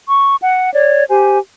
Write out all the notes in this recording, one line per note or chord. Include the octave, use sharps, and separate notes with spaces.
C#6
F#5
C#5 D5
G4 C5 G#5